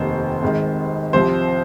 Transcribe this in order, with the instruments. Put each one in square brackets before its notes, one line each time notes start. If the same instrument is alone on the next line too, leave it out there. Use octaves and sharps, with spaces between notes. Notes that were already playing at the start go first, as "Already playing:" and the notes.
Already playing: [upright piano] F1 D#2 D#3 C5
G#1 G#2 D#3
C2 C3 F3 C5